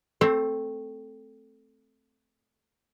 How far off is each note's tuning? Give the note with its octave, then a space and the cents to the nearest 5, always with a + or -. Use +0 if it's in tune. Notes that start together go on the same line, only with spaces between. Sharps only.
A3 +0 C4 +0 C5 +30